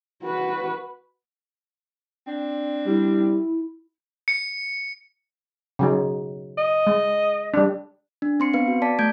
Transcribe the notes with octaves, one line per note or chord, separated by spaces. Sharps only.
F#4 B4
C4 D4
G3 E4
C#7
C#3 F#3 D#4
D#5
G#3
G3 D4
D4
C4 C6 C#7
B3 B4 F5 C#7
F#4
D5 A5 B6
A3 G6 G#6 D7